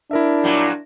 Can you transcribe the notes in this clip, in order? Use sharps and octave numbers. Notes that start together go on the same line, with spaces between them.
D4 E4 A#4 E5
A#2 F#3 G3